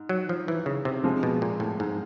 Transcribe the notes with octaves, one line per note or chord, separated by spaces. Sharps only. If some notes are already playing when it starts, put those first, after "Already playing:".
Already playing: G#2
F#3
F3
E3
C#3
C3
C3 F3 G#3
B2
A#2
A2
G#2